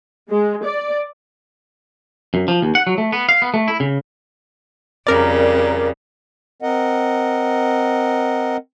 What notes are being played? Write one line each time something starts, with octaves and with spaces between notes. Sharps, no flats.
G#3
D5
F#2
F3
D#2
F#5
F#3
A3
B3
F5
B3
A3
E4
C#3
F2 C#3 G3 A#4 D5
C4 A#4 D#5 F#5